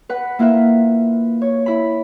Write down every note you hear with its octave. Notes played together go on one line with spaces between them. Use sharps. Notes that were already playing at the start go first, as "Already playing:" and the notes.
B4 F#5
A#3 E4 F4 B4 E5
C#5
E4 B5